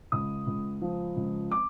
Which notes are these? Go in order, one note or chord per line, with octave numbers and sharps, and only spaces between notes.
C#2 D#6
C#2
F3
C#2
D6